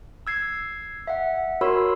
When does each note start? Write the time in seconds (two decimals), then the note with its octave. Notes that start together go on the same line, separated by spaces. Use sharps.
0.27 E6 G#6 C7
1.07 E5 F#5
1.61 F#4 A#4 C#5 B5 C6 E6